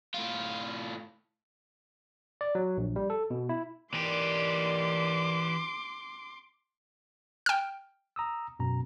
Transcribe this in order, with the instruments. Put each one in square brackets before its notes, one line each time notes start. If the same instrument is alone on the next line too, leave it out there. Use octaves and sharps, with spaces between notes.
[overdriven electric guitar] A2 F4
[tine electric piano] D5
F#3
A#1
G3
A4
B2
E4
[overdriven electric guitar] E3 G4 [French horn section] D#4 A#4 D5 [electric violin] C6 D6
[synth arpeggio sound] G5 F6
[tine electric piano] A#5 D#6 E6
F#2 B2 A#5